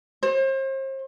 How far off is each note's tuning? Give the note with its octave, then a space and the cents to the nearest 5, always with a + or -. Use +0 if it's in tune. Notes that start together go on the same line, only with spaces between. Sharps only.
C5 +40